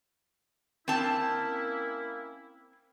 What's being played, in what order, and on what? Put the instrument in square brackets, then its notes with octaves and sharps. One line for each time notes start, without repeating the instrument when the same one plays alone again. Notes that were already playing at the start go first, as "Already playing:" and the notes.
[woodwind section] A#3 C#4 E4 [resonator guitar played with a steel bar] C4 A5